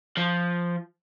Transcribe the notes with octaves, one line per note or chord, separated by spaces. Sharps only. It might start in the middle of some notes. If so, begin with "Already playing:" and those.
F3